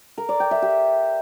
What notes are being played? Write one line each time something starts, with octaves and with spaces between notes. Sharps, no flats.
A#4
D5
G5
E5
G4